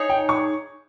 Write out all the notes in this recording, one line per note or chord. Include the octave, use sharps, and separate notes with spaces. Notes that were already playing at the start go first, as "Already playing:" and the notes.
Already playing: D#4 G#4 C#5
G5
C#6